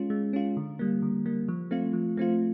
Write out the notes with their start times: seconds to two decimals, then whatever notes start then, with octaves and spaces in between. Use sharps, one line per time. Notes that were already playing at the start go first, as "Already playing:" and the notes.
Already playing: G#3 C#4 F4
0.10 G#3
0.33 C#4 F4
0.57 D3
0.79 G3 A#3
1.02 D3
1.26 G3 A#3
1.48 F3
1.71 A3 C4 F4
1.93 F3
2.17 A3 C4 F4